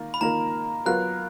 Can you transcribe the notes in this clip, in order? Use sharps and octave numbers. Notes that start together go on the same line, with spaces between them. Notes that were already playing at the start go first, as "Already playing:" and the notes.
Already playing: D#3 A#3 F4 A#4
B5
D#3 A#3 F4 A#4 A#5
F#3 B3 F4 A#4 F#6